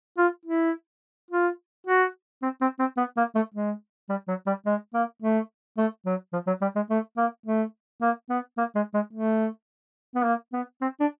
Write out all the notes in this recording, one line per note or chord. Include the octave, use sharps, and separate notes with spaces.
F4
E4
F4
F#4
C4
C4
C4
B3
A#3
A3
G#3
G3
F#3
G3
G#3
A#3
A3
A3
F#3
F3
F#3
G3
G#3
A3
A#3
A3
A#3
B3
A#3
G#3
G#3
A3
B3
A#3
B3
C4
D4